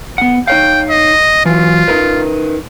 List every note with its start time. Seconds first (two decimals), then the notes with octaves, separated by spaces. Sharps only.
0.18 B3 F#5
0.47 D#4 C#5 F5 G5
0.90 D#5
1.46 E3 F#3 F4
1.88 D#4 A#4 B4